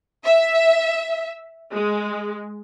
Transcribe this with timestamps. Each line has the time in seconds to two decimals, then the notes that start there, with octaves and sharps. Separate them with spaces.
0.25 E5
1.73 G#3